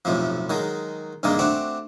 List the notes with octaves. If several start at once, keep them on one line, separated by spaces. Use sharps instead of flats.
B1 F2 A2 C3 F3
D#3 F#3 G#3
G2 C3 D#3 G#3 A#3
A3 C4 D4 F#4